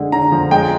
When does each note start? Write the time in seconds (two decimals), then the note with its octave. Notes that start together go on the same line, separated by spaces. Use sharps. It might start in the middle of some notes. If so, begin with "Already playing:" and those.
Already playing: D3 G#3
0.12 D3 A#5
0.32 F3
0.51 G#3 G5